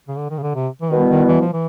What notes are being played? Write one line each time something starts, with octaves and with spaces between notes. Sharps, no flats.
C#3
D3
D#3
C#3
D3
C3
E3
B2 D#3 G3 B3 E4
D#3
E3
F3
E3